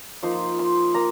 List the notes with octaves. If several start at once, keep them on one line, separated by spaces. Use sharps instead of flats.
F3 A#3 D#4 C6
C6
A#3 A#5